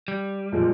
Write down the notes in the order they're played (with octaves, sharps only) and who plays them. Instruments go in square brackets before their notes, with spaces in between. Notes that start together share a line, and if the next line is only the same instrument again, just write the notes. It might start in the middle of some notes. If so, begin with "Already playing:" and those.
[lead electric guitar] G3
[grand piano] A#2 F3 G#3